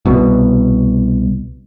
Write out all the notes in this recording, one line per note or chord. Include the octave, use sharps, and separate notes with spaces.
C2 B2